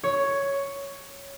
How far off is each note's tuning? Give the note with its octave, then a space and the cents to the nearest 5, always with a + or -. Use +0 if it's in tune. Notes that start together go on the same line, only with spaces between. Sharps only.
C#5 +5